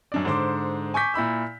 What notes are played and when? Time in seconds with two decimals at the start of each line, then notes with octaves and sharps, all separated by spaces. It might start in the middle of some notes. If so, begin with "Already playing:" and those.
0.12 F#2 D4 D5
0.25 G#2 D3 C5 C6 D6
0.94 G#5 C#6 D6 G6 B6
1.14 A#2 E4 B5 E6